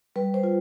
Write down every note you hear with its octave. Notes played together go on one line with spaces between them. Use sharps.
G3 B4
C5
F4